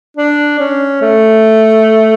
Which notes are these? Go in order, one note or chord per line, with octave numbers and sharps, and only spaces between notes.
D4
C#4
A3